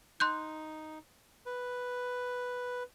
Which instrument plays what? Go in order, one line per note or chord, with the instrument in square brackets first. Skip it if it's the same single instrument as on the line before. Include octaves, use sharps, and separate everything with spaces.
[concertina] D#4 [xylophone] C6 F#6 G6
[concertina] B4